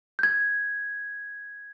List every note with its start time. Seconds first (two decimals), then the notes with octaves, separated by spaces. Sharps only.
0.19 G6 G#6